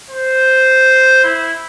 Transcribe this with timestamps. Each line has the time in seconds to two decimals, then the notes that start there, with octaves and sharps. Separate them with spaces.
0.10 C5
1.24 E4